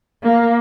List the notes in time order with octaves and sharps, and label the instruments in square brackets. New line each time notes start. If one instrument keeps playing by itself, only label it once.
[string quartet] A#3